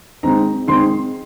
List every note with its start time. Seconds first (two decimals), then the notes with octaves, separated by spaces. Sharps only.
0.23 D#3 G#3 C4 A#5
0.68 D#3 G#3 C4 C6